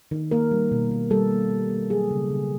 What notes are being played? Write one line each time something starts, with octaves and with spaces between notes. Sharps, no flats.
D#3
A#3 A#4
G3
B2
B2
G3 A4
A#3
A#3
A#3
F#3 G#4
C#3
C#3